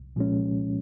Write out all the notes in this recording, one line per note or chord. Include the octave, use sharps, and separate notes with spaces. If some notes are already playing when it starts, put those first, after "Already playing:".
Already playing: C2
A#2 F3 G#3 C#4